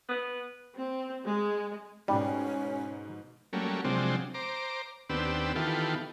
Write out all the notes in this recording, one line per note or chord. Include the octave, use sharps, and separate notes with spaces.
B3
C4
G#3
G#2 B2 G3 C#4
F#3 G3 A3 A#3 C#4
C3 F3 F#3 G#3 C4 D4
C5 A#5 D6
D#2 B3 C4 D4 G4 E6
D#3 E3 B3 F4 G4 A4